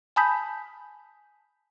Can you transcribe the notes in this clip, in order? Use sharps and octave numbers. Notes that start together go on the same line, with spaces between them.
G#5 A5 B5 D#6 G6 B6